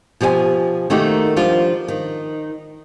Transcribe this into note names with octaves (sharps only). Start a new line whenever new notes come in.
B2 F3 G4 E5 G#5
D#3 A3 A#3 D#4 F#4 G4
F3 G3 D4 F4
D#3